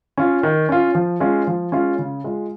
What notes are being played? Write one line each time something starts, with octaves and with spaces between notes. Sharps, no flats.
C#4 F4
D#3
C#4 F4
F3
G#3 C#4 F4
F3
G#3 C#4 F4
C#3
G#3 F4